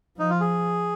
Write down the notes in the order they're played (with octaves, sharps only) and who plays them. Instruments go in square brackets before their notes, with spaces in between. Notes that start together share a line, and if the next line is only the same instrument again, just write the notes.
[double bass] F3 [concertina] D#4
[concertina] F4
G#4